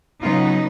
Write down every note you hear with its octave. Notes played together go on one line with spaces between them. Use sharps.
C#3 F#3 B3 D#4 F4